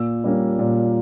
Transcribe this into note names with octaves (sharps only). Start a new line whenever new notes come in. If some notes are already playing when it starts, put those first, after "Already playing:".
Already playing: A#2 E6
G3 A#3 C#4
A#2